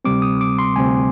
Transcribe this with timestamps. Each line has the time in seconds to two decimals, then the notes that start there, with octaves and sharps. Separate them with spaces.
0.05 D2 C3 G3 C4 D6
0.22 D#6
0.41 D6
0.59 C6
0.76 D2 C3 G3 C4 G#5